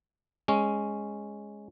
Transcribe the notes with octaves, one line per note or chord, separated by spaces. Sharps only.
G#3 C#4